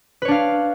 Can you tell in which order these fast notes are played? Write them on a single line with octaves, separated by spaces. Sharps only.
B4 C#5 D4 F5